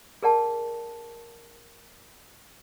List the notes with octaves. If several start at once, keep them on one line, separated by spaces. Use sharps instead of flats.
G#4 A#4 D5 F#5 A5